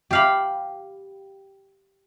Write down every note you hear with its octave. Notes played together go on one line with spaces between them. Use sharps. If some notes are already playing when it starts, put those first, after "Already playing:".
G4 F5 B5